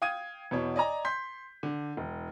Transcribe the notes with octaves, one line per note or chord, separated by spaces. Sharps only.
F5 G5 D#6 G#6 D#7
E2 B2 C#5
D5 D#5 G#5 A#5
C6 G6 B6
D3
E1